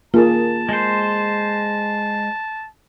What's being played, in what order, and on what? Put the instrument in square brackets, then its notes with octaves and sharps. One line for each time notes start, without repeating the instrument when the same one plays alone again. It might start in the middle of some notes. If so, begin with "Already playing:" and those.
[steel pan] A#3 G#4 A#4 [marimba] F4 [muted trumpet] A5
[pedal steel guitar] G#3 C5